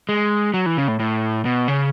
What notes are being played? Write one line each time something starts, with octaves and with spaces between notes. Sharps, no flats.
G#3
F#3
E3
C#3
A2
A2
B2
C#3